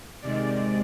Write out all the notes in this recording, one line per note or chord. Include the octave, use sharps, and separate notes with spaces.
C3 D#3 G#3 D5